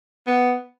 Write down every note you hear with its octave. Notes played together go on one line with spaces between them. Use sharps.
B3